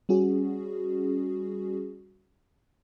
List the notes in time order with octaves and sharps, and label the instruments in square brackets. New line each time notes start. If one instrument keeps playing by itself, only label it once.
[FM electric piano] G3 C#4 F#4 G#4